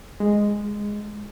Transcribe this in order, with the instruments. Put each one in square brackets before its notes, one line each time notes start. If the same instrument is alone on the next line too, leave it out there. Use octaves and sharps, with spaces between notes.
[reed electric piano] G#3